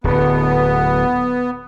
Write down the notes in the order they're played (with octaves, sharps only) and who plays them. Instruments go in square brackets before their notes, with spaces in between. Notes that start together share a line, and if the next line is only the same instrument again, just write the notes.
[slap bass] D1 D3 [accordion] B3